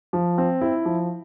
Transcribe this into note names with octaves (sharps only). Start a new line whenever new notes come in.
F3
C4
E4
F3